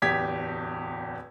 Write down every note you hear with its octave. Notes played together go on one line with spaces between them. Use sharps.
D1 E2 G4 G#6 B6